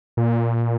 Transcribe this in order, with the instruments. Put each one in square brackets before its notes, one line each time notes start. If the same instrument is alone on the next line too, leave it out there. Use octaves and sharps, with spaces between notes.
[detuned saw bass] A#2